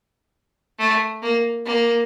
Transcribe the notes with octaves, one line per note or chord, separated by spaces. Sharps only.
A3
A#3
A#3